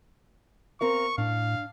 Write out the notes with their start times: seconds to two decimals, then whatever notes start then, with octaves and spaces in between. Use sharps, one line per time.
0.81 C4 A#4 F5 C#6
1.18 A2 D4 F5